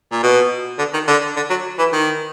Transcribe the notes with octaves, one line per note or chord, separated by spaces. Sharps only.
A#2
B2
D3
D#3
D3
D3
F#3
E3
D#3